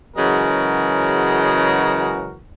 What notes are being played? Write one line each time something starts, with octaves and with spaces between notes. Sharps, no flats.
C#3 E3 F#3 G#3 F#4 A#4